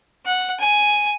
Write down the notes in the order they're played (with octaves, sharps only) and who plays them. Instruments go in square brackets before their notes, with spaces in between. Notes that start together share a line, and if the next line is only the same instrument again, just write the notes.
[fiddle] F#5
G#5